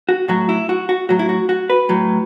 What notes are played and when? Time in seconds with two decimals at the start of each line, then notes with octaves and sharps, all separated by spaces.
0.09 F#4
0.28 A2 F#3 F#4
0.49 E4
0.69 F#4
0.89 F#4
1.09 A2 F#3 F#4
1.19 E4
1.29 F#4
1.49 F#4
1.70 B4
1.89 A2 F#3